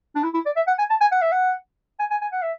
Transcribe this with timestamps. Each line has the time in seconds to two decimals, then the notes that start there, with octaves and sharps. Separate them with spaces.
0.15 D4
0.23 E4
0.34 E4
0.46 D5
0.56 E5
0.67 F#5
0.78 G#5
0.90 A5
1.01 G#5
1.11 F#5
1.21 E5
1.32 F#5
1.99 G#5
2.11 G#5
2.21 G#5
2.32 F#5
2.42 E5